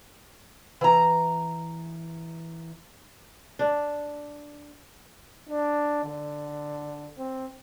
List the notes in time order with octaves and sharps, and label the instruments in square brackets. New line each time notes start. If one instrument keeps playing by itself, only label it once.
[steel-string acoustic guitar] E3 A#5
[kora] D4
[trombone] D4
D3
C4